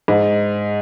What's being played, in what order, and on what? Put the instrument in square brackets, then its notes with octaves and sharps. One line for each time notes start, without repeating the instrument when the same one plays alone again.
[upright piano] G#2